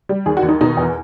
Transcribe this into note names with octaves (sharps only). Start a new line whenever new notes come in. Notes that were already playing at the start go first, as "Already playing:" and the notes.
G3
D#2 G#4
F#4
D#2
D#4
B2 D#4
E2